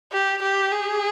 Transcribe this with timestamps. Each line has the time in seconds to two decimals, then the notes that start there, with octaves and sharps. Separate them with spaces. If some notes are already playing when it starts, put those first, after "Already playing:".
0.12 G4
0.42 G4
0.72 G#4